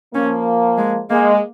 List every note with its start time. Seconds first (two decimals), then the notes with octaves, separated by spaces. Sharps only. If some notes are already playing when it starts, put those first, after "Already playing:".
0.14 F3 A#3 C#4
0.78 G#3
1.10 G#3 A#3